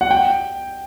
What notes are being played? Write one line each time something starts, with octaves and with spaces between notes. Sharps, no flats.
F#5
G5